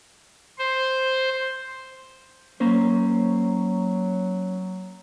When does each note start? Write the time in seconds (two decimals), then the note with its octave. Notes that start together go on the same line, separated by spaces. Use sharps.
0.58 C5
2.60 F#3 A#3 C#4 C5